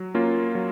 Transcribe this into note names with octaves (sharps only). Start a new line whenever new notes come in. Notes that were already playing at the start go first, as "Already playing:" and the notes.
Already playing: F#3
A#3 C#4 F4
F#3